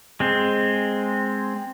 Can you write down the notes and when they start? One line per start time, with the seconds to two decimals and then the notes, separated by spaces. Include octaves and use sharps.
0.20 G#3 C4